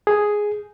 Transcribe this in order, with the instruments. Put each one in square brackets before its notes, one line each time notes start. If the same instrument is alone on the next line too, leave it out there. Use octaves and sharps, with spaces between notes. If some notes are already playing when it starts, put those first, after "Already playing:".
[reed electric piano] G#4